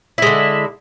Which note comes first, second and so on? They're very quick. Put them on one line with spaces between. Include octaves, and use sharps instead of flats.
E4 G#3 D3